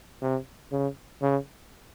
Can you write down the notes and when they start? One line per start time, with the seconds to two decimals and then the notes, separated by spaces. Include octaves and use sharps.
0.21 C3
0.72 C#3
1.22 C#3